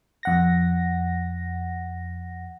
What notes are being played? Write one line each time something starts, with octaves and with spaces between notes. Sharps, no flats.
F2 F#5 A#6